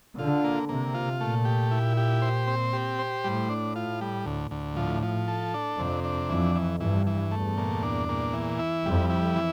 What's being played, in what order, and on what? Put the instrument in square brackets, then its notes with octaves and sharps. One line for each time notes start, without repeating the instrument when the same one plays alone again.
[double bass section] D3 [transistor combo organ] F4
[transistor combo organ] A#3
[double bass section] C3 [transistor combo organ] A#3
[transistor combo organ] F4
[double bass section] A#2 [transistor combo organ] A3
[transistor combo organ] G4
E4
G4
C5
C4
G4
C5
[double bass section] A2 [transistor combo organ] G3
[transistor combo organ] D4
F4
G3
D2
D2
[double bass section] A2 [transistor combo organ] F3
[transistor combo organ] F3
A4
D4
[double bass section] F2 [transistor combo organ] C3
[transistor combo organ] D4
[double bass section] F2 [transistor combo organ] E3
[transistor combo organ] E3
[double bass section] G2 [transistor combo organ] E3
[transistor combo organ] E3
[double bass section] E2 [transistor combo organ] A3
[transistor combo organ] A#2
D4
A#2
E3
E4
[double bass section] F2 [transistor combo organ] G3
[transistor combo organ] E4
E3